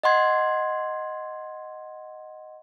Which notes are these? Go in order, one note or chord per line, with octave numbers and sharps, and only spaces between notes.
D#5 F#5 C6 G#6